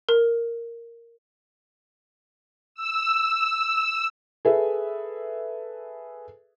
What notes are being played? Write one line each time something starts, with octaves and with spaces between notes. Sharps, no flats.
A#4
E6
G#4 A4 B4 E5